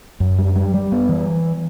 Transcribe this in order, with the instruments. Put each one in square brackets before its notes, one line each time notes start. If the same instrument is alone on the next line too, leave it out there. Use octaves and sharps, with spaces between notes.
[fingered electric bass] F#2
G3
G3
G3
B3
E3